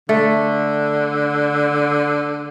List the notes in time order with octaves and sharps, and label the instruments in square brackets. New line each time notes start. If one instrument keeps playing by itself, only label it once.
[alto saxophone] D3 [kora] A3